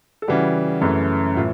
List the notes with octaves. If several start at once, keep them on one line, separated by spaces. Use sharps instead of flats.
A4
C#3 E3 G3 F#4 G#4
F#2 C#3 E3 A3
A2 E3 F4